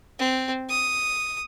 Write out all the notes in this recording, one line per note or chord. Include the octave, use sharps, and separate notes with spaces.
C4
D#6